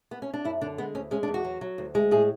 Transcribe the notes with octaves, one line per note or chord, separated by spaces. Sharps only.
B3
C#4
D4
F#2 E4
D3 D4
G#3 B3
D2 C#4
G#3 C#4
D4
E2
F#4
F#3
F#3
D2
G#3
A2 G#4